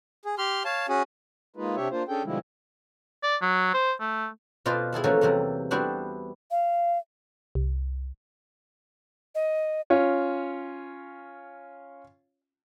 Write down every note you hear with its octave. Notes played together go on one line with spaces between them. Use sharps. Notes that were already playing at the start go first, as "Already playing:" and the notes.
G#4
G4 C6 F6
C#5 F5 A5
C#4 F#4 G#4
G#3 A#3 D#4 F4 B4
C3 D4 G4 C#5 E5
A#3 D4 F4 C5
C#4 D4 G#4 A4 G5
B2 D3 F3 G3 G#3 E4
D5
F#3
C5
A3
B2 F4 B4 C5 D5 D#5
E4 G#4 A4 E5
E3 F3 A3 A#3 C#4 F#4
E2 C3 E3 G3
G3 B3 D4 E4 F#4 C5
F5
C2
D#5
C#4 F4 C#5